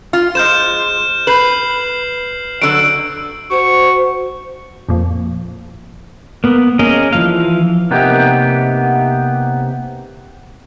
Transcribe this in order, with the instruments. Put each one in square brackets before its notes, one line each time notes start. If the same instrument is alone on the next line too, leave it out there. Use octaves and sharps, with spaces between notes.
[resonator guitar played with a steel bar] F4
[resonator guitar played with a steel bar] G#3 C5 [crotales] F6 G6 E7
[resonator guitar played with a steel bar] B4 [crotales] G6 C7 F#7
[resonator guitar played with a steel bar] D3 F#3 [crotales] E6 D7
[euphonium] F#4 [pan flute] C5 [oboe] C#6
[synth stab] F2 A#2
[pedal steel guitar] A#3 B3
A#3 C#4 G#4 A#4 D#5
E3 F3 F5
[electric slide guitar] C3 A#3 B3 D#4 G4